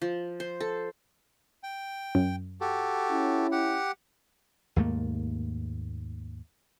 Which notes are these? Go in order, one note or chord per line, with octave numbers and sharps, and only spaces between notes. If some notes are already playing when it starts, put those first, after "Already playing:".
F3
C5
A4
G5
F#2
F#4 G4 A4
C#4 E4
G4 F#5
D#2 G#2 A3 A#3